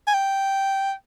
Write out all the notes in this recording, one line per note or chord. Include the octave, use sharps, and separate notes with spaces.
G#5
G5